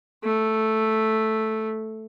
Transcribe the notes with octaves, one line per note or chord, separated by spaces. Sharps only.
A3